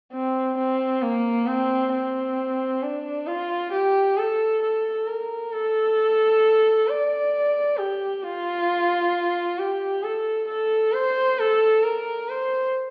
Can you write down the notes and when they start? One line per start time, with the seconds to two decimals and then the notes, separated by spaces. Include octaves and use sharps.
0.12 C4
0.58 C4
1.02 A#3
1.46 C4
1.92 C4
2.83 D4
3.27 F4
3.72 G4
4.17 A4
4.62 A4
5.07 A#4
5.53 A4
6.88 D5
7.77 G4
8.24 F4
9.59 G4
10.03 A4
10.48 A4
10.93 C5
11.39 A4
11.83 A#4
12.29 C5